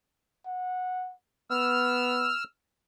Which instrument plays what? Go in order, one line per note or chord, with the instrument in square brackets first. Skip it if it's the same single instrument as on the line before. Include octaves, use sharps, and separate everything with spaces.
[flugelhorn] F#5
[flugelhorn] B3 [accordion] E6 F6